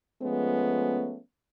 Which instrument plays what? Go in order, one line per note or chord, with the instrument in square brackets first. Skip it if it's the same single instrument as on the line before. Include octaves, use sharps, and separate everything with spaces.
[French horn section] F3 G#3 A3 B3 C#4